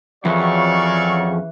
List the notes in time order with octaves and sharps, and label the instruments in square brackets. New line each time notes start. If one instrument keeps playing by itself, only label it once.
[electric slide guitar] F2 [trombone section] C#3 F#3 [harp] E3 [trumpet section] D5 F5 C#6